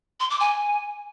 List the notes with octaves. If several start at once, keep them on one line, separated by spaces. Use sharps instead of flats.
C6
D6
G#5